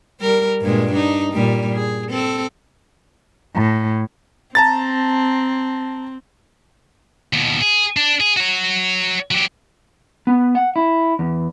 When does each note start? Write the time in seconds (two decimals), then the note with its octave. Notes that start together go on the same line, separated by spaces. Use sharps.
0.21 G3 A#4
0.62 G2 A#2 G#3
0.92 D4 D#4
1.33 A#2 G3
1.73 G#4
2.11 C4 A4
3.55 A2
4.55 C4 A5 A#5 A6
7.33 D#2 B2
7.61 G#4
7.97 D4
8.20 G#4
8.36 F#4 C#5
9.31 F#3 G4
10.27 B3
10.55 F#5
10.76 E4
11.19 E2